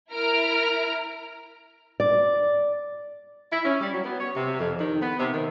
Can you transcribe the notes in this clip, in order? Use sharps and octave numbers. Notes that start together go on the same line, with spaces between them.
E4 A#4 A#5 F6 D7
D5
E4
C#4
G3
F#3
B3
C#5
C3
F2
D#3
B3
C3
D#3